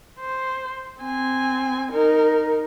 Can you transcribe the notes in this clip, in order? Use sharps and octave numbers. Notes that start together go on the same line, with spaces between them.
C5
C4 G#5
D#4 A#4